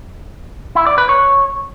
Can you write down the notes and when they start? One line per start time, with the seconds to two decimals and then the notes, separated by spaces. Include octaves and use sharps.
0.75 E4
0.87 D5
0.98 B4
1.09 C#5